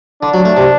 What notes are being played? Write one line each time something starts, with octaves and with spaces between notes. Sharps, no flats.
D3 D4
F#3
A3
C3